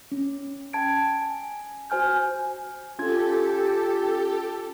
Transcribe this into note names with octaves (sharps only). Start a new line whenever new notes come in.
C#4
G5 A5 G#6 D7
G#5
F#4 C5 G#5 F6 G6
C#4 F4 G4 A4 G#6